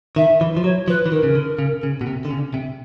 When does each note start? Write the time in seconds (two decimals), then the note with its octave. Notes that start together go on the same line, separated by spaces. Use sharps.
0.16 D#3 E5
0.41 E3
0.57 F3
0.64 F#3 C#5
0.88 F3 B4
1.06 E3
1.12 D#3 A#4
1.23 C#3
1.35 D3
1.59 C#3
1.83 C#3
2.01 B2
2.07 C3
2.25 D3
2.31 C#3
2.54 C3